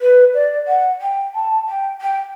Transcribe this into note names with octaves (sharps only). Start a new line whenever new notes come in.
B4
D5
F#5
G5
A5
G5
G5